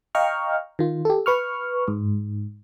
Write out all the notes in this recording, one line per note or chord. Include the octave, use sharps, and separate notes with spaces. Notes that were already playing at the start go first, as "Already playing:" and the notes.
D#5 F5 G5 A#5 C#6 F6
D#3 F4
G4 A4
B4 C#6 F6
G#2